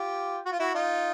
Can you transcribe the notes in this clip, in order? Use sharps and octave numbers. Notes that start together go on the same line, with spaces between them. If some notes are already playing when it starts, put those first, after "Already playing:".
Already playing: F4 G4
F#4
F4
E4 F#4
D#4 F4